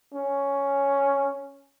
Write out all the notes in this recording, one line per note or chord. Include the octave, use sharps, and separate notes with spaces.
C#4